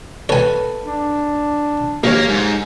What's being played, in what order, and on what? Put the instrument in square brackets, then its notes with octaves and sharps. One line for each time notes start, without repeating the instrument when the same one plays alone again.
[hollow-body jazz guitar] A4 B4 [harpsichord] C#5 G#5
[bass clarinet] D4
[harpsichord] A#1 [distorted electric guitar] A#3 A#4 [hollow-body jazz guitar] G4 C#5
[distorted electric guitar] G#2